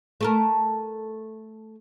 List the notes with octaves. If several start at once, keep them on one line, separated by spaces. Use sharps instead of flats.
A3 A4 A#4